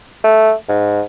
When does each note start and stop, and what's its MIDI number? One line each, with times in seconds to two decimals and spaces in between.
0.24 0.53 57
0.69 1.02 44